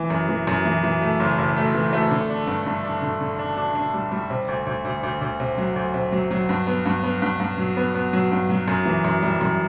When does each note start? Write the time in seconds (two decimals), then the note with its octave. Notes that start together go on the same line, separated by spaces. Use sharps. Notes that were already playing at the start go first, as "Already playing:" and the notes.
Already playing: E3
0.10 F#2
0.29 E3
0.47 F#2
0.65 E3
0.83 E3
1.01 A3
1.20 F#1
1.38 F#1
1.57 A3
1.74 E3
1.93 A3
2.11 D3
2.29 D4
2.47 G2
2.66 G2
2.84 D4
3.02 D3
3.21 D3
3.39 D4
3.57 D4
3.75 D4
3.94 G3
4.12 G3
4.30 C3
4.48 D2
4.66 D2
4.85 D2
5.03 D2
5.21 D2
5.40 C3
5.58 F#3
5.76 D2
5.94 C3
6.12 F#3
6.31 F#3
6.49 G2
6.67 B3
6.85 G2
7.04 B3
7.22 G2
7.40 G2
7.58 F#3
7.77 B3
7.95 B3
8.13 F#3
8.31 G2
8.50 F#3
8.68 F#2
8.86 E3
9.04 F#2
9.23 G3
9.41 F#2